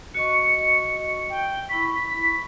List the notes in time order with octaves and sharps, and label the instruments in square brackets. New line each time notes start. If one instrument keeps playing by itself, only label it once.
[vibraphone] F#4 D#5 C#6 [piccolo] C#7
[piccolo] G5
[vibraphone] E4 B5 C#6 [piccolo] B6
[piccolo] B6